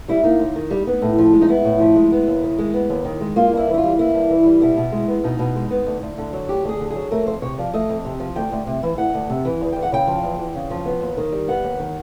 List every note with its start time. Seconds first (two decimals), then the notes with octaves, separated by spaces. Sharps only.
0.08 G3 E4
0.24 A#3 D#4
0.39 D#2
0.56 D#3
0.71 G3
0.87 B3
1.02 A2
1.18 F3
1.33 G#3
1.42 D#4
1.49 B3 E4
1.64 A2
1.80 F3
1.96 G#3
2.12 B3
2.27 D#2
2.43 D#3
2.59 G#3
2.74 B3
2.90 D#2
3.05 D#3
3.21 G#3
3.36 A#3 F4
3.52 G2 E4
3.68 E3
3.74 E4
3.78 F4
3.83 G3
3.99 A#3 E4
4.14 G2
4.30 E3
4.46 G3
4.61 B2 E4
4.77 B2
4.92 G#3
5.08 B3
5.23 B2 D#4
5.39 B2
5.55 G#3
5.71 B3
5.87 D2
6.02 D2
6.18 D3
6.33 F#3
6.49 D2 G4
6.64 D2 G#4
6.80 D3
6.90 F#3 G#4
7.11 A3 A#4
7.27 F2 C5
7.42 C3 C#5
7.58 F3 D5
7.74 A3 D#5
7.89 F2
8.05 C3
8.20 F3
8.36 D2 G5
8.52 D2
8.67 C3
8.83 E3
8.98 D2 F#5
9.14 D2
9.30 C3
9.45 E3
9.61 E2
9.72 E2 G5
9.82 F#5
9.92 C#3 G5
10.07 F3
10.23 E2
10.38 E2
10.55 C#3
10.70 F3
10.85 B3
11.01 D#2
11.17 D#3
11.32 G3
11.48 B3 F#5
11.64 D#2
11.79 D#3